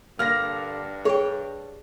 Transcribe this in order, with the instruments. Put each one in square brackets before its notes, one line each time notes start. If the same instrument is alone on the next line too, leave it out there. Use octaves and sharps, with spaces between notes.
[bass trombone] G2 [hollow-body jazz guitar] D3 A#3 [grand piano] F6 A#6
[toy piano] G#4 [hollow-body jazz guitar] C#5 G5